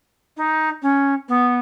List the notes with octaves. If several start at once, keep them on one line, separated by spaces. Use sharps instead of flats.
D#4
C#4
B3